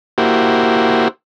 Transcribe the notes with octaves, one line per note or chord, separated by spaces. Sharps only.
A#3 E4 F#4 G4 C5